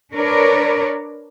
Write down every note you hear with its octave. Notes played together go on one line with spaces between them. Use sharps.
D4 A#4 B4 C#5 D5